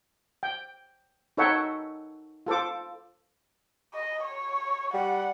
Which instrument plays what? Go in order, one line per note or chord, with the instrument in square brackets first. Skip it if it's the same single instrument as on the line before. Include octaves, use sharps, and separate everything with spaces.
[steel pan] G5
D#4 A4 C#5 E5 F#5 G5
F4 A4 C5 D6
[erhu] D#5
C#5
[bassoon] G3 [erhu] F#5